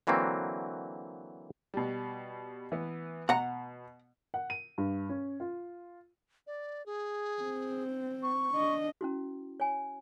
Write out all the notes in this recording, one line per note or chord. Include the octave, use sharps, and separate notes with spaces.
D3 E3 F#3 A#3 C4 F#4
B2 G3
E3 B3
B2 F#5 A#5
F#5
D#7
G2
C#4
F4
D5
G#4
C4
C#6
D4 D#5
C#4 E4 F#4
C#5 G#5